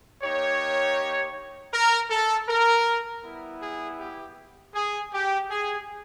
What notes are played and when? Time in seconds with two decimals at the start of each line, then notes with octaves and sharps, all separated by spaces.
0.22 A#3 D#4 G4 C#5
1.73 A#4
2.10 A4
2.48 A#4
3.24 G3 B3 E4
3.61 G#4
3.99 G4
4.74 G#4
5.13 G4
5.51 G#4